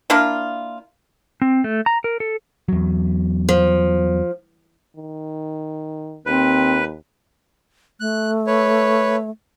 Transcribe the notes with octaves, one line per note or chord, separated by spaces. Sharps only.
A#3 D4 E4 F4
C4
A3
A#5
A#4
A4
E2 F#3
F3
D#3
D#2 C4 B4
A3 F#6
B4 C#5